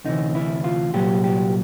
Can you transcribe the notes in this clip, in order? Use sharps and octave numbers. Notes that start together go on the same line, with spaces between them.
D2 C3 E3 D#4
E4
F4
C2 A#2 F#3 G4
G4